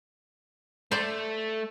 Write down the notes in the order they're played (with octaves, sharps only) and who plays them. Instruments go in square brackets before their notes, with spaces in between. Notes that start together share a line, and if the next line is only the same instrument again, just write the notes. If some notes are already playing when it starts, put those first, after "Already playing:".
[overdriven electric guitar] A3 [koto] C5 D5